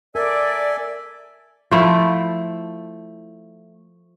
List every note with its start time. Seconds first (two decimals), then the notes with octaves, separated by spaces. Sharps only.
0.15 A4 A#4 D5 E5 G#5
1.71 F3 A3 E4